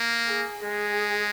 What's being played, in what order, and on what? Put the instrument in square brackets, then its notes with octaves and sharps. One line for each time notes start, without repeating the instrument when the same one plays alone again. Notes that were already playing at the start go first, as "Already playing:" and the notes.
Already playing: [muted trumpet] A#3
[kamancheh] G#4
[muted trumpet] G#3 [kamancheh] G#4